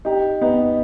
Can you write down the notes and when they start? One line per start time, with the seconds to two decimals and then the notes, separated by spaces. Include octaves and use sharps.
0.05 D#4 G4
0.41 B3 D#4